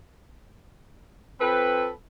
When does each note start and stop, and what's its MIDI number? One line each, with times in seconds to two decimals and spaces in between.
1.39 1.88 53
1.39 1.88 60
1.39 1.88 69
1.39 1.88 71